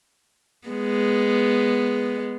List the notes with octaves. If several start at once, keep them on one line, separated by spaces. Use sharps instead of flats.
G#3 B3